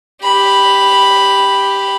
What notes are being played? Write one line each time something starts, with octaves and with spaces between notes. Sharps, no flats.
G4 B5